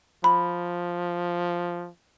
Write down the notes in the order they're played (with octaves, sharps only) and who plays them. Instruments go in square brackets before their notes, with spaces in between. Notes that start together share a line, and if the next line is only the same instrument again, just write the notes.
[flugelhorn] F3 [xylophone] B5